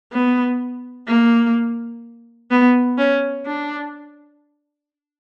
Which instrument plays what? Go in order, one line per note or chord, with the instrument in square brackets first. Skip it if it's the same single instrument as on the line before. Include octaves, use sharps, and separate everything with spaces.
[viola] B3
A#3
B3
C#4
D4